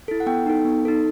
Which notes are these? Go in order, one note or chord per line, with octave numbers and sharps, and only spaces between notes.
E4 A4
F#5
B3 G5
D#4 A4
B3
D#4 A4